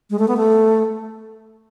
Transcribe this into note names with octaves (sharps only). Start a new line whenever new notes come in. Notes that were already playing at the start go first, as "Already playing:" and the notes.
G#3
A3
B3
A3